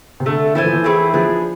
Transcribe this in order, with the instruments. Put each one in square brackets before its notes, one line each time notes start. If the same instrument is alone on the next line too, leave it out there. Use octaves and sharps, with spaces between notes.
[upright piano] C3
[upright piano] D3 [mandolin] A3 D4 A4
[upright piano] E3 [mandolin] E4 A4 C5 G#5
[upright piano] F3
E3
[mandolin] A3 C4 E4 G#4
[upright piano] F3 [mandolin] B3 D4 G#4